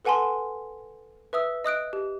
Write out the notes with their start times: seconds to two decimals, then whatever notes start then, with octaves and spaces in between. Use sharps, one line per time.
0.05 A4 B4 F#5 G#5 A5 C6
1.33 B4 E5 D#6 E6
1.64 D#5 D#6 F#6 D7
1.93 G4